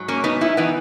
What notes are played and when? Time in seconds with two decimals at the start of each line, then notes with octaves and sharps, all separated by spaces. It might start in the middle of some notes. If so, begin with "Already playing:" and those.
Already playing: G#2 F#3
0.08 A#3 C#4
0.24 B3 D#4
0.41 C#4 E4
0.57 E3 B3 D#4